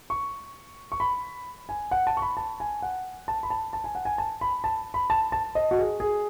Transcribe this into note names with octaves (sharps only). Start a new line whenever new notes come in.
C#6
C#6
B5
G#5
F#5
A5
C#6
B5
A5
G#5
F#5
A5
B5
A5
A5
G#5
F#5
G#5
A5
B5
A5
B5
A5
A5
D#5
F#4
G#4
G#4